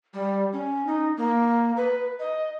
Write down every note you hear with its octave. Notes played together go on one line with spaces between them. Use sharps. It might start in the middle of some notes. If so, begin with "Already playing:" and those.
G3
C#4
D#4
A#3
B4
D#5